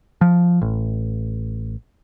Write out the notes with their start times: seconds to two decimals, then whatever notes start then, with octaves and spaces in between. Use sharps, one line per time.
0.21 F3
0.62 A1